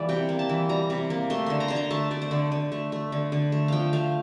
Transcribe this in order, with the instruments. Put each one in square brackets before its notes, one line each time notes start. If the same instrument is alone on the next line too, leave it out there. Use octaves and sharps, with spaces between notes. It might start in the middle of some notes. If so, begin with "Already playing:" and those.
Already playing: [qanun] E3 G3 A#3 D5
C3 G5
A#3
A5
E3
G3 A#5
C3
A#3
A3 C6
D3 C6
A#5
D3 C6
A#5
A3 A5
A3 D5
C5
D3 D5
D3
A3
A3
D3
D3
A3
F3 F5 G5
A3 F5